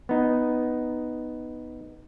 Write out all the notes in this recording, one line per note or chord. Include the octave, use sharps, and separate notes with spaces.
B3 D#4